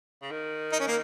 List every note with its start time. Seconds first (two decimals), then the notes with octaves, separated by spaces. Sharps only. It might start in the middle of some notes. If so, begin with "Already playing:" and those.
0.22 C#3
0.31 D#3
0.72 D#4
0.80 C#4
0.87 A#3